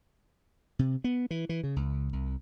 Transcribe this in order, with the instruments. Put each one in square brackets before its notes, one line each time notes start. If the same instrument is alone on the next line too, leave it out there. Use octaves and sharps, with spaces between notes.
[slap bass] C3
B3
E3
E3
C#3
C#2
C2